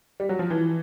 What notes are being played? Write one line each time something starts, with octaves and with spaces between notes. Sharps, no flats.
G3
F#3
F3
E3